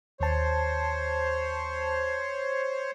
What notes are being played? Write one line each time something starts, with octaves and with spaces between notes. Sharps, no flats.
D#2 C5 C#5 A5